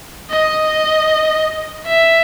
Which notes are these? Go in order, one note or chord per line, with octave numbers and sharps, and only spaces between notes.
D#5
E5